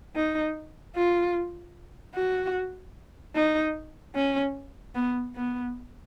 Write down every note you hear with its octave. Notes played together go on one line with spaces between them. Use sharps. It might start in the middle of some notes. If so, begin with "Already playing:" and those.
D#4
F4
F#4
D#4
C#4
B3
B3